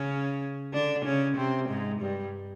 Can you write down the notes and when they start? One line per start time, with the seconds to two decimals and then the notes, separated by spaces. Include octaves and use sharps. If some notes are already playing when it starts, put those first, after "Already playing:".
Already playing: C#3 C#4
0.73 D3 D4
1.05 C#3 C#4
1.37 C3 C4
1.69 G#2 G#3
2.01 G2 G3